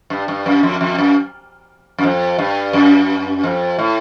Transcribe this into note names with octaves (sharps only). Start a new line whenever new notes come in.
G2
G2
F#2
F2
F2
F#2
F#2
F2
G2
F#2
F2
A2